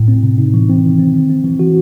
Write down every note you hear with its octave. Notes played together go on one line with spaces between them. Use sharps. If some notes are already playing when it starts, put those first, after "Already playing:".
Already playing: A2
C4
C3
D#4
E3
C4
D#3
C4
D#3
C4
E3
F#4